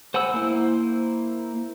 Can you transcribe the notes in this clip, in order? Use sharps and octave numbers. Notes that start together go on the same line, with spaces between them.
C5 F#5 G#5 B5 E6
A#3 E4 C5